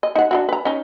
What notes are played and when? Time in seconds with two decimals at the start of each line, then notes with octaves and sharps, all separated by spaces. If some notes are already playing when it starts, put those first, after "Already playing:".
0.03 D#5
0.15 D#4 F#5
0.31 D4 E4 F#4
0.49 B4 A#5
0.65 C#4 D#4